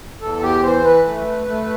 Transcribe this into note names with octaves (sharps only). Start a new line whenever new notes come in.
E2 A4
G4
E3 C5
B4
A3
A3